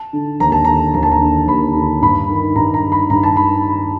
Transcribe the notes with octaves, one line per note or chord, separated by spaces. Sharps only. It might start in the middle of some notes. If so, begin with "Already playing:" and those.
Already playing: A5
D3
D#2 A#5
A5
D3 A#5
D#2 A#5
A5
A#5
D3
D#2 B5
D3
G2 B5
D#3
G2 A#5
A#5
D#3
B5
G2 A#5
A5
D#3 B5